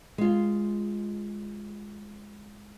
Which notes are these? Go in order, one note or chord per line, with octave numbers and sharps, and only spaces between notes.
G#3 F4